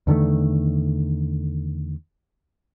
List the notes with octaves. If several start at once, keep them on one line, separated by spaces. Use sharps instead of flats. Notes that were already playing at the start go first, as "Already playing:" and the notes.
E2 D3 D#3 A3